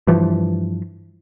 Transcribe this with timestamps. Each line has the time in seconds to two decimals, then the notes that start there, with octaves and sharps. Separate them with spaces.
0.07 G2 E3 F3